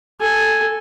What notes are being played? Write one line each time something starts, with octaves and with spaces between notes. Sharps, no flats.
A4 G#5